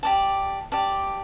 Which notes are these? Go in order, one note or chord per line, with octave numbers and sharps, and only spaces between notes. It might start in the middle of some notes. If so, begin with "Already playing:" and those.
G4 D5 A5
G4 D5 A5